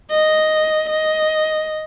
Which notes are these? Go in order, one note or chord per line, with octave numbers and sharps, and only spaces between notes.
D#5
D#5